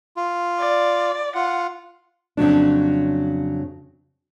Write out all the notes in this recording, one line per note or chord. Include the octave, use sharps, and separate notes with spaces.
F4
D5
F4 F#5
F2 C#3 F#3 D4